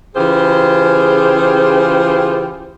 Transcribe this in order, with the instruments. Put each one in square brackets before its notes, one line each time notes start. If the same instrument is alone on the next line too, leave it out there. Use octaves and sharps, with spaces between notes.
[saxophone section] C#3 E3 F4 G4 G#4 C5